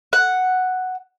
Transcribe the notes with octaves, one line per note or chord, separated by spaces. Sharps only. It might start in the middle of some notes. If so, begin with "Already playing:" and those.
F#5